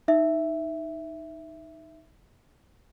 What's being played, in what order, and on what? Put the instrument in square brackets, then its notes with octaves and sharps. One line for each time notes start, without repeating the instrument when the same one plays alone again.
[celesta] D#4 E5